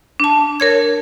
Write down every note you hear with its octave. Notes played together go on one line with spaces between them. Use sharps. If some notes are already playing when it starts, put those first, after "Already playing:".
D4 A5
A#4 C#5 G#6